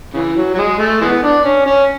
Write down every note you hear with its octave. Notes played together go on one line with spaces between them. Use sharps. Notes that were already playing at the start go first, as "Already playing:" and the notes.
C#3 E3
F#3
F#3
G#3
A3
E3 G#3 B3
D4
C#4
C#4